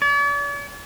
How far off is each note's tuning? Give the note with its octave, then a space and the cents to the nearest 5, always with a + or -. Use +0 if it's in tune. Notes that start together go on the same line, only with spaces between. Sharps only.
D5 -45